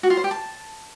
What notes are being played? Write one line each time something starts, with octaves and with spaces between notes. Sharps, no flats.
F#4
F4
C5
G4
A5